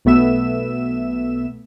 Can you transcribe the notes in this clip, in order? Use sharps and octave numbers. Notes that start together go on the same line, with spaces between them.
B1 B2 A3 B3 E5 E7